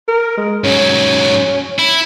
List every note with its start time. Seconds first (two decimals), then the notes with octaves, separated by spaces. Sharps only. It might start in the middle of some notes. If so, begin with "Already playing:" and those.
0.08 A#4
0.37 G#3
0.64 G#2 F#3 C#4
1.79 E4